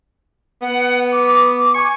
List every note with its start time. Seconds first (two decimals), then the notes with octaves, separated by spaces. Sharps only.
0.62 B3 F#5
1.12 D6
1.74 G#5 C#6